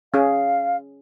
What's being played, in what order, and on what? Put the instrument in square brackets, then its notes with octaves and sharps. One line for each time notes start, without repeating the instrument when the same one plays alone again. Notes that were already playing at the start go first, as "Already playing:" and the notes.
[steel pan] C#4 G#4 [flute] F5